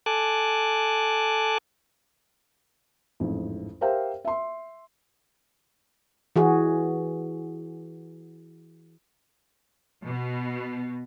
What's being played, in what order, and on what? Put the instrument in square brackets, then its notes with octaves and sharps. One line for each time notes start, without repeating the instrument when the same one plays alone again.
[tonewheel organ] A4 G#5 A5 D6 F#6
[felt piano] A1 F2 G#2
G4 A#4 C5 E5 F5 G5
E5 C6
[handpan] E3 F#4 G#4
[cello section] B2